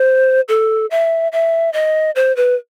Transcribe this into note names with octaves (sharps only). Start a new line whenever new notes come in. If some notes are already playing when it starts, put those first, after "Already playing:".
Already playing: C5
A4
E5
E5
D#5
C5
B4